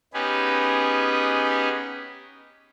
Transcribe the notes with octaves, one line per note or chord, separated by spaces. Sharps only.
B3 C#4 D#4 G4 G#4 B4